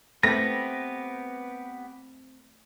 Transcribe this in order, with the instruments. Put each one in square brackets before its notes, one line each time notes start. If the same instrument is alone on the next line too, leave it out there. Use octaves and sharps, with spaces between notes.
[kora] A3 [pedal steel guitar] B3 G4 B4 [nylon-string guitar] C4 [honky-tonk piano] A#6